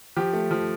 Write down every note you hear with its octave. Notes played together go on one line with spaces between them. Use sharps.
F3 G4
A3
F3